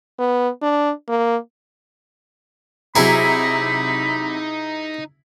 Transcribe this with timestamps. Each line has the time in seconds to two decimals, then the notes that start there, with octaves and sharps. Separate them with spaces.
0.19 B3
0.62 D4
1.08 A#3
2.96 C3 F#3 D#4 E4 G#4 A#5 B5